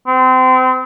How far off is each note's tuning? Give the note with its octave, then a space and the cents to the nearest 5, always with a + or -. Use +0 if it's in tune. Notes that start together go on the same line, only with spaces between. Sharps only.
C4 -30